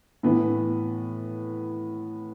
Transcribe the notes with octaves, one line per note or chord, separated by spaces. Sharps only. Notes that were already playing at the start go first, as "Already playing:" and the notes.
A2 E3 B3